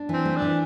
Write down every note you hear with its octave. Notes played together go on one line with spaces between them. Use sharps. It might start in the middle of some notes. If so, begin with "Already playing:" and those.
Already playing: D4
E3 C4
A3
D4
E3